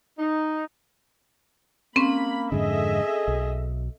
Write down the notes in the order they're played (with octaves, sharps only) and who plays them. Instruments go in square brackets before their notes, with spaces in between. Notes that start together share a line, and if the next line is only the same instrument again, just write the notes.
[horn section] D#4
[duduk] A#3 [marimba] C4 C#4 [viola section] B5
[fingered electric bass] F2 G#2 D3 [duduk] G#4 [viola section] A4 D#5 E5
[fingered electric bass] B1